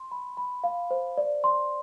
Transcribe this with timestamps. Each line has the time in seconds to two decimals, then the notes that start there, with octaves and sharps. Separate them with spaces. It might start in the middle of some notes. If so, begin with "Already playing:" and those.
Already playing: C6
0.11 B5
0.37 B5
0.64 F5
0.91 C5
1.17 D5
1.44 C6